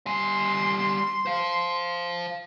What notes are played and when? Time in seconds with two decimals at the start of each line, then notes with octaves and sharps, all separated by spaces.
0.07 G3 G#5 C6
1.26 C5 F5